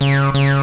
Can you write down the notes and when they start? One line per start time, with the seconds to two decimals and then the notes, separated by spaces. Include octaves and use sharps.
0.01 C#3
0.34 C#3